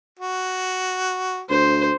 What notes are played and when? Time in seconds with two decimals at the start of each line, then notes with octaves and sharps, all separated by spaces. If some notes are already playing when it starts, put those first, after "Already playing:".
0.19 F#4
1.50 D2 C5